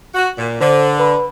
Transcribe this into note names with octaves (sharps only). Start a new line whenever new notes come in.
F#4
A#2
D3 C5
B4 B5